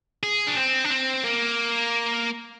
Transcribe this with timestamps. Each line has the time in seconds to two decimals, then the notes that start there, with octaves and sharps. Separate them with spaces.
0.23 G#4
0.47 D4
0.56 C4
0.84 D4
0.91 C4
1.24 A#3